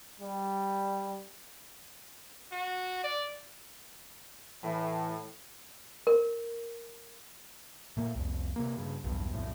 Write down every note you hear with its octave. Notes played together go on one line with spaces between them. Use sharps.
G3
F#4
D5
A2 E3
A#4
A#2 A3 A#3
C2 F2
C3 A#3
G2 C#3
B1 E2 G2
B1 F2 A2